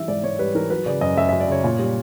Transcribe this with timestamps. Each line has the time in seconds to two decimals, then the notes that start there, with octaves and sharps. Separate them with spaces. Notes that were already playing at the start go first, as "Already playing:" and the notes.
Already playing: E3 G3 E5
0.08 G#2 D5
0.24 G#2 C#5
0.39 G3 B4
0.55 E3 A#4
0.70 F#3 B4
0.86 C#3 D5
1.01 F#2 D#5
1.17 F#2 E5
1.29 E5
1.33 F#3
1.40 D5
1.48 C#3 C#5
1.64 A#2
1.79 G3